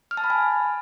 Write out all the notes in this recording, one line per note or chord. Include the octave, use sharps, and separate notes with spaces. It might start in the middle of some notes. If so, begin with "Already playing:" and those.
F6
A5
B5
G#5